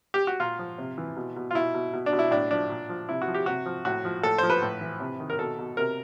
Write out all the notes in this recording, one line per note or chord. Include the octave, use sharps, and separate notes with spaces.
G4
F#4
A#2 F4
F3
C3
E3
B2
B2
F4
B2 E4
B2
B2
D4
B2
E4
A2 D4
F3 D4
A#2
F3
C3 E4
F#4
F3
G4
C3 F#4
F3
A2 F#4
F3
A2 A4
F3 C5
B4
A2
E3
C3
D#3
A#4
B2 A4
B2
C3 A#4